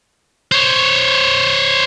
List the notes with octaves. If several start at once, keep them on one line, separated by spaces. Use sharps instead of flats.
C5 C#5